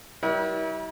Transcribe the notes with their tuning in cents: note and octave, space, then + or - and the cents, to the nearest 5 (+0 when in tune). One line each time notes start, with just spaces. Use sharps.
G3 -35 E4 -35 A#4 +45